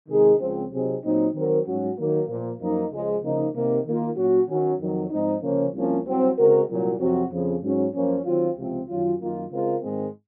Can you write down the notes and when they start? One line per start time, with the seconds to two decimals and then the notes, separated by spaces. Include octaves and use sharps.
0.08 C3 D#3 G#3 D#4 G#4
0.40 C#2 C#3 F3 C4
0.71 C3 F#3 C4 D#4 G#4
1.03 A#2 F#3 C4 D#4
1.34 D#3 F#3 C4 F#4 A#4
1.66 G#2 F#3 C#4 F#4
1.97 D#3 F#3 A#3
2.28 A#2 F3 A#3
2.60 F#2 F3 A#3 D#4
2.91 C#2 C#3 F3 G#3
3.22 C#3 F3 A#3 D#4
3.54 C3 D#3 A#3
3.85 D#3 A#3 F4
4.16 A#2 F#3 C#4 F#4
4.48 D#3 F#3 C#4
4.80 F2 D#3 F#3
5.10 G#2 F3 C4 D#4
5.42 C#3 F3 A#3 C#4
5.73 C2 C3 F3 A#3 C#4
6.05 C2 C3 F#3 C4
6.37 C#3 G#3 C4 F#4 A#4
6.69 C2 A#2 F#3
6.99 F2 C3 F#3 C4 F#4
7.31 F2 C#3 F3
7.63 G#2 F#3 C#4
7.94 F#2 F3 A#3 C#4
8.24 D#3 F#3 C4 F4
8.56 C#2 C3 F3 C4 F4
8.88 F#2 D#3 F#3 C#4 F4
9.19 F#2 D#3 A#3 F4
9.51 C#3 G#3 C4 F4 A#4
9.81 G#2 D#3 G#3 C4